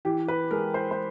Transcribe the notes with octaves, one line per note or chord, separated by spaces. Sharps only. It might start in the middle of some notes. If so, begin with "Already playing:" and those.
E3 G4
B4
G#3 A#4
C5
C5